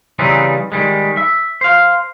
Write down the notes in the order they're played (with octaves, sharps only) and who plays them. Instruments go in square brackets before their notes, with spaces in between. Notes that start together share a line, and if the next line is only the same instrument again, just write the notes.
[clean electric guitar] C#3 E3 G3 C4 C#4 D#4
D#3 G3 G#3
E5
C5 F5